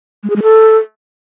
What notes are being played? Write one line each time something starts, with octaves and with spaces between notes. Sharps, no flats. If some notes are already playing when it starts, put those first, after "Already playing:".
G#3
G#4
G#3
A4